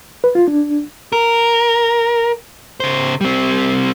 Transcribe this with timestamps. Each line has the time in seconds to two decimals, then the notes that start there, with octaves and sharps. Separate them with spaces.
0.24 B4
0.35 F4
0.48 D4
1.12 A#4
2.80 C#3 C5
3.21 G3 C4